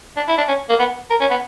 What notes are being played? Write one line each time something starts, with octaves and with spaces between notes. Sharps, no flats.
D4
E4
D4
C#4
A#3
B3
A#4
C#4
B3